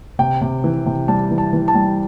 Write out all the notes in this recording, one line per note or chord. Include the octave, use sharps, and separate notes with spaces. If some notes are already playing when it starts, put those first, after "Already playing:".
C3 G5
C3
E3
C3
G3 A5
E3
A5
E3
A5
G3